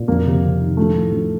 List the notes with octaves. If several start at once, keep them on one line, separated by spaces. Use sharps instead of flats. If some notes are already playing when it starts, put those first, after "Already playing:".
Already playing: A#2
F2 A#3
C3
C3
D#3
F3 A3
A2
F3